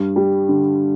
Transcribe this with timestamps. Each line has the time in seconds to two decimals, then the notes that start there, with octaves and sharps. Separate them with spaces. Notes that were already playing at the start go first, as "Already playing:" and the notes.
Already playing: G2
0.16 G3
0.49 D3